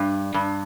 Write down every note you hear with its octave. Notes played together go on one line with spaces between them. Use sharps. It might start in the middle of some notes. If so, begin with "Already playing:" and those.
Already playing: G2
G2